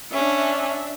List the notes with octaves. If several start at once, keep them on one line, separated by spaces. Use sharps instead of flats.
C#4 D4 E5